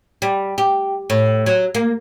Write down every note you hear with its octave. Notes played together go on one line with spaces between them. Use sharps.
G3
G4
A2
F#3
A#3